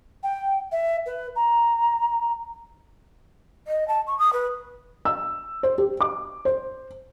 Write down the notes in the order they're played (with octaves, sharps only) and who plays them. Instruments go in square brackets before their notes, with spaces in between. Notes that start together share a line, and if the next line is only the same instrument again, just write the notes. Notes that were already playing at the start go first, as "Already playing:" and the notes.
[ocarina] G5
E5
B4
A#5
[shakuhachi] D#5
A5
C#6
D#6
B4
[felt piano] E6
C5
G4
D6
C5